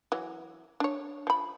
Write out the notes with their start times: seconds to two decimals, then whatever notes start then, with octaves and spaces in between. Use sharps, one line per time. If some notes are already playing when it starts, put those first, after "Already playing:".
0.12 E3 F#3
0.80 D4 C#5
1.27 F3 B5